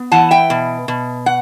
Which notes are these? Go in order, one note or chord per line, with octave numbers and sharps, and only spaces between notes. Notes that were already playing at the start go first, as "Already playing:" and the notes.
Already playing: B3
E3 F#5 A5
E5 G5
B2
B2
F#5